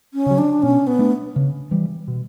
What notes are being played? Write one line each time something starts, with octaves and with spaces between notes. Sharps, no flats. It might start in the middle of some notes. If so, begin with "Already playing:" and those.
C#4
C#3 F#3
D4
B2 C#4
B3
A3 D4
C#3
E3 G3
B2